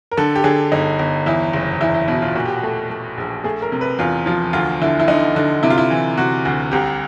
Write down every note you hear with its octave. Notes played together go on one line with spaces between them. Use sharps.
A#4
D3 A4
G4
D3 G#4
G1 D#4
G1
E2 E4
F#1
E2 E4
E4
B2 E4
F4
A#2 F#4
G4
F#4
A3
A3
A#1
A3 G#4
A#4
C3
B4
E2 F4
F3 F4
D2 F4
D3 E4
E4
D3 D#4
D3
C3 E4
F4
E4
E3
C3 F#4
D2
C2 G4